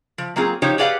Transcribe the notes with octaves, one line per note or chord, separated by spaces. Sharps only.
F3
F#3 A#3 C4 F4 G#4
F3 D#4 G4 C#5
G4 G#4 B4 D5 F5 F#5